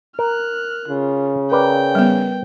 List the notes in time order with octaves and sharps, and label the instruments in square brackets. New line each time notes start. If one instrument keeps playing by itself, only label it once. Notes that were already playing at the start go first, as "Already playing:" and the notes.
[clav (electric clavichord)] A#4 [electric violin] F6 F#6
[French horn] C#3 [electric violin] F4
[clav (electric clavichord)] A#4 B4 D5 [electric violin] G5
[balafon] G3 B3